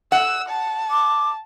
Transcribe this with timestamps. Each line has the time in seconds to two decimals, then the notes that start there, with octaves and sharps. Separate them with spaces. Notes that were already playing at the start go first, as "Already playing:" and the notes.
0.12 F#5 E6
0.49 A5
0.91 D6